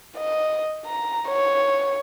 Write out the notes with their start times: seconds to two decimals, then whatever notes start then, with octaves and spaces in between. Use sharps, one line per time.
0.17 D#5
0.86 A#5
1.29 C#5